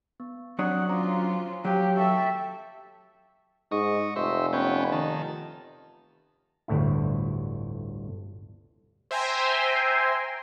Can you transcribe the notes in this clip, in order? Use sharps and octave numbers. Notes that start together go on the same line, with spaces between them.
B3
F#3 C4 D4 C#5 F#5 D#6
C#4 F4 C5 A#5 D6
F#3 G4 C#5 F5 G5
A4 E5 G5 C#6
G#2 D#5 C#6
F1 C5 E5
B3 C#4 G5
D#3 A5
G1 D2 A2 E4
C5 E5 G5 G#5 A#5 C6